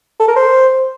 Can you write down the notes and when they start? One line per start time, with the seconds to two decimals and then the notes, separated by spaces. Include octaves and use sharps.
0.20 A4
0.28 A#4
0.36 C5